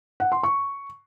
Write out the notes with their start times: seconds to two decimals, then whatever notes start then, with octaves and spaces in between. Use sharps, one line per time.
0.20 F#5
0.32 C6
0.43 C#6